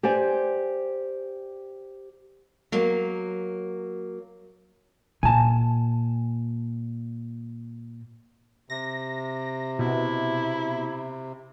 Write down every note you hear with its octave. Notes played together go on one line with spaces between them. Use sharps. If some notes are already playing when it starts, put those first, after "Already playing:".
G4 C5 D5 G#5
F#3 A#3
A#2 G#5 A5
C3 A#6
B2 E4